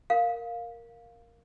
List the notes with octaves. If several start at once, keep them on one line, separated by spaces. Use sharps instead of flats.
A#4 F5